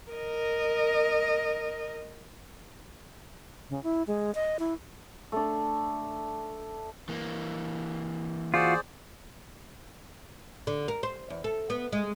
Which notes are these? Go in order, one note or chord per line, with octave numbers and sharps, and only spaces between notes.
A#4 D#5
C#3
E4
G#3
D#5
E4
A3 D4
E3 A#3
F4 F#4 G#4 C5 D5
D3
A#4
C5
E2
A4
B3
G#3